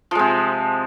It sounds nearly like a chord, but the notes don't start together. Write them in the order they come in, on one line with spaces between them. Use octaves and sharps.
F3 G#3 C3